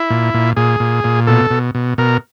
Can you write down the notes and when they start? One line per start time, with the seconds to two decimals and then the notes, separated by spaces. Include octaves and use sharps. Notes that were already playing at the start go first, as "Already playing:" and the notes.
Already playing: E4
0.10 A#2
0.34 A#2
0.57 A#2 G#4
0.80 A#2
1.04 A#2
1.27 B2 A4
1.51 B2
1.75 B2
1.98 B2 A#4